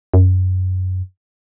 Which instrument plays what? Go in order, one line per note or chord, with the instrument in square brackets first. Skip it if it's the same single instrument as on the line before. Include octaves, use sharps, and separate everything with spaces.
[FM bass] F#2